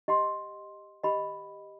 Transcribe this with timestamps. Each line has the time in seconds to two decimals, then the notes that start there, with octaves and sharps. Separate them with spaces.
0.08 G4 D#5 F#5 C6
1.03 G4 B4 D#5 F#5 B5